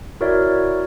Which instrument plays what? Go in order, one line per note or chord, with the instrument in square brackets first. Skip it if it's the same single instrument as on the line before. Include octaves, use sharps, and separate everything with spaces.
[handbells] E4 F#4 A#4 C#5 D5 E5